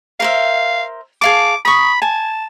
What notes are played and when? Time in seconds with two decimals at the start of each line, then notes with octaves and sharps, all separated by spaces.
0.20 A#4 C5 E5 F5
1.22 G#4 F5 A5 D6
1.65 B5 C#6 D#6
2.02 G#5 A5